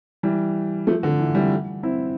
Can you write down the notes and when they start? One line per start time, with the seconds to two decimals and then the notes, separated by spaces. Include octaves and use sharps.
0.23 E3 G3
0.87 F3 A3
1.03 D3
1.19 E3
1.35 E3 G3
1.83 C4 E4